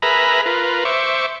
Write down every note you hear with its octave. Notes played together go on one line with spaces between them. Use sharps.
G#4 A#4 B4 E5 A#5 B5
F4 A#4 B4
C5 E5 C#6 D6